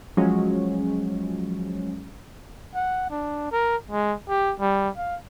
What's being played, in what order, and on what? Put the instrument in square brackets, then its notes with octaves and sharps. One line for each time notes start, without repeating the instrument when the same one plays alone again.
[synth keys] F3 F#3 G#3 C#4
[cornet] F#5
D4
A#4
G#3
G4
G3
F5